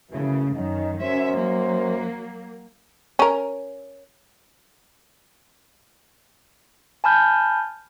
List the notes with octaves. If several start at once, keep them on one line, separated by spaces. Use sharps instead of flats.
F#2 C#3 E3 A3
F#2 D#3 C#4 D#4
F#2 C#4 C5 E5
F#3 A#3
C#4 A#4
G#5 A5 B5 F6 G6